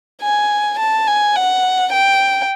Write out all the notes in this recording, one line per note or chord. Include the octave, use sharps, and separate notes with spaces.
G#5
A5
G#5
F#5
G5